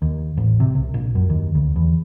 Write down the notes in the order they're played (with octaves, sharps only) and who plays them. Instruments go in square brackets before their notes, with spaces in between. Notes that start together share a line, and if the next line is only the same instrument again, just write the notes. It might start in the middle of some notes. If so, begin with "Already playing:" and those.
[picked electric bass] D#2
A1
C3
C2
A#1
F#2
D#2
D2
E2